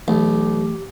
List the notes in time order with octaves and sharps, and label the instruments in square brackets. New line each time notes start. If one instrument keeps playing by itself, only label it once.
[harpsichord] B1 [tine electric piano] E3 A3 [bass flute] G4